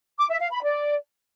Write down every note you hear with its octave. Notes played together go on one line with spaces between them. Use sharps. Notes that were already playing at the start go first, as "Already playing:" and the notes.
D6
E5
F5
B5
D5